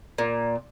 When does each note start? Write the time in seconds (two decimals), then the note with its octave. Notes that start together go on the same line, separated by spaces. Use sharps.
0.18 A#2